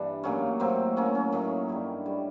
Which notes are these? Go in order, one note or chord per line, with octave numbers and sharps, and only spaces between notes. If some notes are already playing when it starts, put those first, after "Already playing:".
Already playing: G2 E3 G3 D4
A2 F#3 A#3 C#4
A2 F#3 A#3 C4
A2 F#3 A#3 C#4
C#4
A2 F#3 A#3 D#4
G2 D#3 G3 E4
D#3 G3